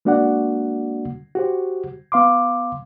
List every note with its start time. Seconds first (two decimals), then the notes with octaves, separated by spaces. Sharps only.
0.05 G#3 A#3 D4 F#4 D5 F#5
1.35 F#4 G4 C5
2.12 B3 F5 C6 D6